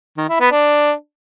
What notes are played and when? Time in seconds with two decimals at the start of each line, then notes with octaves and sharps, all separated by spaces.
0.18 D#3
0.29 E4
0.40 B3
0.52 D4